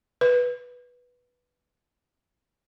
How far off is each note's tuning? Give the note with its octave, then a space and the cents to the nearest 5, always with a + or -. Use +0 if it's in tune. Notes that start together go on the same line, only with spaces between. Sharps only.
B4 -5